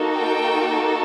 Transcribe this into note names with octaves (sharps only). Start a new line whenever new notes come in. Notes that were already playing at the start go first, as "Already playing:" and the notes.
Already playing: A#3 D#4 F#4 A4
G5